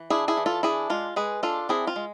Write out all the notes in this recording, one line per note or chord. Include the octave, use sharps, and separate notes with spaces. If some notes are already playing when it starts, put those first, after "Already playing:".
Already playing: E3
D4 E4 G#4
E4 G#4
E3
F4 A4
D4 E4 G#4
G#3 F4
G#3 G#4 B4
D4 F4 A4
C4 E4 G#4
F4
G#3